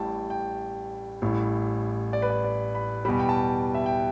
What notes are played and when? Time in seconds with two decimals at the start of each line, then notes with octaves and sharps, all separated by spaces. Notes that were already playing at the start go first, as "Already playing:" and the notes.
Already playing: A1 A2 G3 G5 A5
0.30 G5
1.22 A1 A2 G3
2.13 D5
2.22 B4
2.30 D5
2.44 D5
2.75 B5
3.05 G3 B5
3.08 E2 B2
3.19 G5
3.29 A5
3.75 E5
3.86 G5